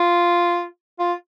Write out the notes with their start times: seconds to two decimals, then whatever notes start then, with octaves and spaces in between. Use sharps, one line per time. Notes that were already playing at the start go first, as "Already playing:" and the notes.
Already playing: F4
0.99 F4